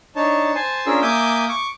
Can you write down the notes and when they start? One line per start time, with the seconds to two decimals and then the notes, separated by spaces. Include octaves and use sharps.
0.16 D4 D#4 C#5 A5
0.55 C5 G#5 A5
0.86 C#4 D4 F4 G#4 A#4 E6
1.02 A#3 E5 G#5 D6 D#6 G6
1.49 C#6 D6